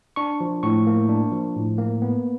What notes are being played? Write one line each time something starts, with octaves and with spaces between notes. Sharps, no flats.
D4 C#6
F3
A2 C#6
A#3
D4
F3
A2
A#3
B3